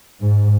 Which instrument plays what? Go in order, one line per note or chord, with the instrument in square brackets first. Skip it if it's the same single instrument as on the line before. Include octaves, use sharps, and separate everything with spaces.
[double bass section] G#2